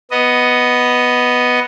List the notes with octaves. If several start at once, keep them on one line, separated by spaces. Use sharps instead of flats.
B3 D#5